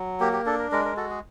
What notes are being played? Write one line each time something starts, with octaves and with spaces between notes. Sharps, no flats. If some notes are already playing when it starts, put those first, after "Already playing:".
Already playing: F#3
A#3 G4
G4
D4 A4
A#4
G#3 A#4
A#4
F#4 A4
G#4